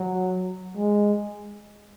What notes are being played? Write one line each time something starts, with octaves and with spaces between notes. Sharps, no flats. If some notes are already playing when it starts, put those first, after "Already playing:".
Already playing: F#3
G#3